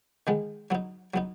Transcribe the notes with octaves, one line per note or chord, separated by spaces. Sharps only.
D#3 G#3 B3 D#4
F#3 B3 D#4
F#3 B3 D#4